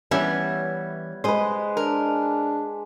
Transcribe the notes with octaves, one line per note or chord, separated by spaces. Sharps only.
E3 G3 B3 C#4 C#5 E5
G#3 B4 C5 D#5
D4 A#4